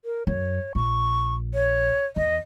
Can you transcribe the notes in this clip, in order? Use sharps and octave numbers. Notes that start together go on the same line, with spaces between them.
A#4
F#2 C#5
A#1 C#6
C#5
E2 D#5